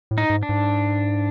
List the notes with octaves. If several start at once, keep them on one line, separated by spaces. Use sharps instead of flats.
A2
D#4
G#2
D4
G#2